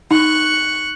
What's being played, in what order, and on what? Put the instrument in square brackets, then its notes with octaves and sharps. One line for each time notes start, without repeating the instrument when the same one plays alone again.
[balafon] D#4 [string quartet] C#6 F#6